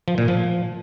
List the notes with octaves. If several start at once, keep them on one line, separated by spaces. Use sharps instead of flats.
F3
A#2
F3